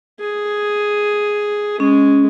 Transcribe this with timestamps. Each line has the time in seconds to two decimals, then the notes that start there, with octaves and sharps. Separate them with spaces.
0.20 G#4
1.80 G#3 C#4